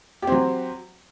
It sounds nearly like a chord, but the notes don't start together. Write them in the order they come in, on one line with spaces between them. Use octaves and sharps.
G4 C4 F#3